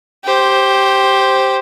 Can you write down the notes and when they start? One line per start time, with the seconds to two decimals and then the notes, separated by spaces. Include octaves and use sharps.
0.24 G4 C5